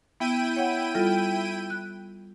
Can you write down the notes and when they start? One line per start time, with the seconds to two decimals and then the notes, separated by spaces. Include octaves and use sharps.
0.20 B3 E4 G5 D#7
0.56 C#5 F#5
0.95 G3 F4 A4
1.70 F#6